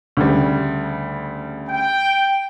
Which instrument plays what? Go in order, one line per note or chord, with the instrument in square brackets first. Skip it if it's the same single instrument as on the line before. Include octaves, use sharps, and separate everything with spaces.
[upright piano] D2 C#3 G3
[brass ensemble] G5